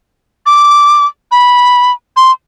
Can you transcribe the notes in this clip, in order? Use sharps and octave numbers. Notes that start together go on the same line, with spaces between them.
D6
B5
C6